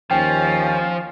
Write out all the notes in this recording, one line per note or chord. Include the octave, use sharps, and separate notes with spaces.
D#2 F3 C#4 G5